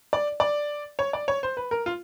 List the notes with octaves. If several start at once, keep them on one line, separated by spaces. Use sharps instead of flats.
D5
D5
C#5
D5
C#5
C5
B4
A#4
F4